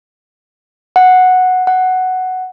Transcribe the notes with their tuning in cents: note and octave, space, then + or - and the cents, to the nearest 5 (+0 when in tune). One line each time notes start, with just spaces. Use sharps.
F#5 -5
F#5 +5